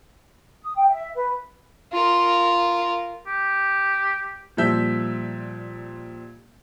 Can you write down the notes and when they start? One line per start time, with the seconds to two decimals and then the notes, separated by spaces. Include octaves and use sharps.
0.62 D#6
0.76 G5
0.89 E5
1.16 B4
1.93 F4 A#4
3.27 G4
4.57 A#2 F3 G3 E5 G6